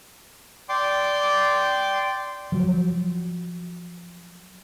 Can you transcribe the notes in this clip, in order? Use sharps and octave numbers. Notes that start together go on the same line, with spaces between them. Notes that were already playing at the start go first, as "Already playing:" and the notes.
D5 G5 C6 D6
F3 F#3